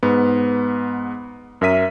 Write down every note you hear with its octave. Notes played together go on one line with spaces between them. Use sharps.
G#2 B3
F#2 A#4 E5 B6 D#7